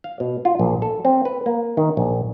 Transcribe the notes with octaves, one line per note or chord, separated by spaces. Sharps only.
F5
B2
F4
A#1
A4
C4
B4
A#3
D#3
A#1